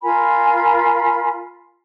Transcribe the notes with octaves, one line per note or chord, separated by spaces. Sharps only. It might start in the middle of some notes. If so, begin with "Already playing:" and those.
F4 A#4 G#5 B5